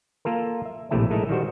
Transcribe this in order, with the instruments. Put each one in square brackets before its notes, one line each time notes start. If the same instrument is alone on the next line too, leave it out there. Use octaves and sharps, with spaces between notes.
[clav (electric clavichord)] A#3 F4 A4 A#4
E5
A#1 A2 C3 A3 E4 A5
G#3 A3 D#4 E4 A4 A#4
D#3 G3 F#4 C5